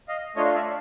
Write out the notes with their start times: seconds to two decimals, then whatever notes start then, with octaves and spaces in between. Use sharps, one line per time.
0.08 D#5 F5
0.36 A3 D4 F4 C#5 D#5
0.46 F5
0.54 D5 E5